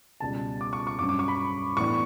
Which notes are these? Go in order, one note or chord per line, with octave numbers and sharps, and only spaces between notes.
C#2 B2 G3 A5
D6
C#6
C#6
G2 F#3 C#4 D6
D6
C#6
B5
A2 E3 B3 D4 C#6